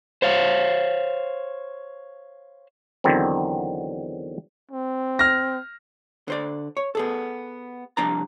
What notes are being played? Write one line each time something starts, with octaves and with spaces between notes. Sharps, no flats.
C5 C#5 F5
E2 D3 D#3 F#3 C4
C4
F6 A#6
D3 C5 D5
C#5
B3 G#4 A4
C2 F3 D4 A5 A#5